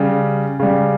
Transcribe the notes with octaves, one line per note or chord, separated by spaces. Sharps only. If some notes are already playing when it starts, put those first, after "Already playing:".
Already playing: C#3 G3
C#3 G3